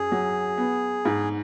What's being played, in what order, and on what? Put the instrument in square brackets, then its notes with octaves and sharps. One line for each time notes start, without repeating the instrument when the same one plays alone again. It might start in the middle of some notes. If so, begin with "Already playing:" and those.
Already playing: [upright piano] F#2 [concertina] G#4
[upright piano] F#3
B3
G#2